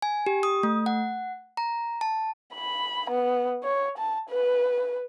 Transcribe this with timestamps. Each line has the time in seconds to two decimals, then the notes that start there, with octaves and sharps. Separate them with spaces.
0.02 G#5
0.26 G4
0.43 D#6
0.63 A3
0.86 F#5
1.57 A#5
2.01 A5
2.54 B5
3.10 B3
3.63 C#5
3.98 A5
4.29 B4